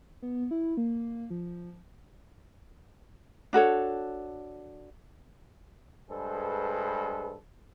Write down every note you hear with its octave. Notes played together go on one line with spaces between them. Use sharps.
B3
E4
A#3
F3
D4 F#4 A4 C#5
G2 G#3 G#4 A4 B4 C5